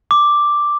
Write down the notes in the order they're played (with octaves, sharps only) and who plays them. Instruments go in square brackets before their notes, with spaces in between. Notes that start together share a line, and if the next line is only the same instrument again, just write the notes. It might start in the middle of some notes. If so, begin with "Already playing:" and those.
[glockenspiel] D6